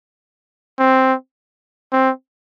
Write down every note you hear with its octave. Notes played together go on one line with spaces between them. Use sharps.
C4
C4